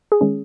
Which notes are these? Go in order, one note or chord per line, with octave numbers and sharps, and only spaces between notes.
G#4
D#3 G#3 C#4